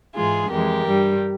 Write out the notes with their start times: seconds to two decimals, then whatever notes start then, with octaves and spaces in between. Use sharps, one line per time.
0.13 G#2 E3 G#3 F4 G#4
0.49 F2 E3 G#3 G4 A#4
0.85 G2 G3